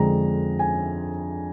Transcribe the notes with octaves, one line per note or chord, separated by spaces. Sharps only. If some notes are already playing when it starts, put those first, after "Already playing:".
Already playing: F2 D3 G#3 A#5
G#5